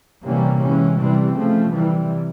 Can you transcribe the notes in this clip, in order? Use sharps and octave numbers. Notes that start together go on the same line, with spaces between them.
C3 E3 G3 A#3 C#4
E3 G#3 C#4
C3 E3 G3 C4
C#3 F3 A3
C3 E3 G3